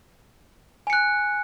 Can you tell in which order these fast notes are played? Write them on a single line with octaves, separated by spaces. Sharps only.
G#5 C#7 F#6